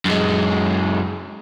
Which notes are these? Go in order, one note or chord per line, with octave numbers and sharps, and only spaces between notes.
F#2 G#3